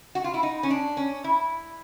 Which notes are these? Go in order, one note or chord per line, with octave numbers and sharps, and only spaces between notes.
F#4
F4
E4
D#4
C#4
D4
C#4
E4